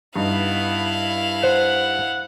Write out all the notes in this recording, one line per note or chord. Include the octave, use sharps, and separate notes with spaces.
G2 B3 D#4 E4 D#5 F5
C5 F#5